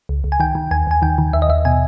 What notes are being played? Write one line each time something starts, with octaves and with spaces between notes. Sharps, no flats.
C#2
C#2
G#5
D#3 G5
D#3
D#2 G#5
D#2 G#5
D#3 G5
D#3
D#2 E5
D#5
D#2 E5
B2 G#5